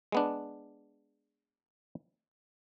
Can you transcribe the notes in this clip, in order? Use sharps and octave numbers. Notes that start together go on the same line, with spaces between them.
G#3 B3 D4